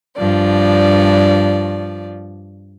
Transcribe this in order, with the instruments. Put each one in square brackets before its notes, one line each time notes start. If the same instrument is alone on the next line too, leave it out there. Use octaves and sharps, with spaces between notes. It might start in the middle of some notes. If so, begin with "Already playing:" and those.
[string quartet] G2 F3 D5